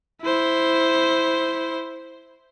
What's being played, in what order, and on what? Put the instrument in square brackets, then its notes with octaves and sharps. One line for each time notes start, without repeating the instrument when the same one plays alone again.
[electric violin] E4 C5